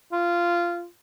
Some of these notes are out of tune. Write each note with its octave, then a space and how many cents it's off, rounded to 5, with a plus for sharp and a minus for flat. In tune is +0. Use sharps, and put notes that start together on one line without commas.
F4 -15